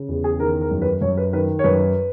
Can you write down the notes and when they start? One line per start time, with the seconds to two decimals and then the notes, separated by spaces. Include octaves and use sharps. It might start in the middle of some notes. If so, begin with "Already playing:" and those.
Already playing: C#3
0.09 E2
0.24 G#4
0.40 D#3 A#4
0.61 A#4
0.71 F#2
0.82 B4
1.01 F#2 C#5
1.17 B4
1.33 D#3 B4
1.59 C#5
1.64 F#2 B4